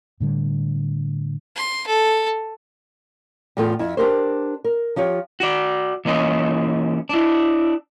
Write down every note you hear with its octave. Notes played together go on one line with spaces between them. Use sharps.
A2 D3 G3
C6
A4
E2 A2 F4 G#4 A4 G5
F2 E4
D4 G4 A#4 C5
A#4
F3 F4 G4 C#5
F#4 D5
E3 A#3 C#4 D#5
D4 E4